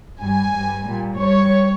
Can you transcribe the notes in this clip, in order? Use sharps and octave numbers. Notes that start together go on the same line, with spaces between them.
G2 G3 G#5
G2 G3
A#2 G3
G2 G3 C#5